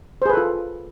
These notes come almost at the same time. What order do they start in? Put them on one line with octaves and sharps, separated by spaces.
C5 G#4 B4 A4 F4